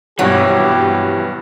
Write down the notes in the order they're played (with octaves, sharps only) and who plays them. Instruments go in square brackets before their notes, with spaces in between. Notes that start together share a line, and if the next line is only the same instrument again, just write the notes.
[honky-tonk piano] G#1 G2 B2 [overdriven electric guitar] E3 [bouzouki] F#3 [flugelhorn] G4